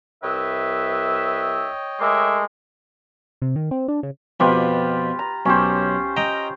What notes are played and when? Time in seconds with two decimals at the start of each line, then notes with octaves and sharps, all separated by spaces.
0.23 C2 B4 C#5 D#5 E5 G5
2.00 G#3 A3 A#4 E5 C6 D6
3.42 C3
3.56 D#3
3.71 C4
3.88 D4
4.03 C#3
4.40 F2 B2 F4 G4 B4
5.19 A#5
5.46 B1 C#4 G4 C5
6.17 D#5 G5 A#5